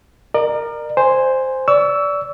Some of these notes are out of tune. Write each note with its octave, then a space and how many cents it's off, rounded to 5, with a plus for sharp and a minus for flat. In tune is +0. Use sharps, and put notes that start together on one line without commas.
A#4 +0 D5 +40
C5 +0 G#5 -10
D5 -20 C#6 +40 E6 +0